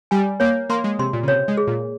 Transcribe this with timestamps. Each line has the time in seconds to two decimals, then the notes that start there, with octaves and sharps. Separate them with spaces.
0.11 G3 G#5
0.40 A#3 C#5
0.70 A#3 C6
0.84 G#3
0.99 C3 C6
1.13 A#2
1.23 C#3
1.28 C3 C#5
1.48 G#3
1.57 G#4
1.67 A#2